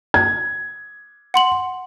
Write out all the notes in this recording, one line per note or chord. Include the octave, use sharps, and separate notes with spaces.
G#6
F#5 C6 F#7